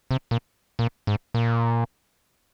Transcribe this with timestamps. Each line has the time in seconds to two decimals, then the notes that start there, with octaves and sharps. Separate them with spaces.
0.11 C3
0.31 A#2
0.79 A#2
1.07 G#2
1.34 A#2